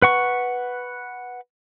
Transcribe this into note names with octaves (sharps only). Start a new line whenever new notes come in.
B4 F#5 C#6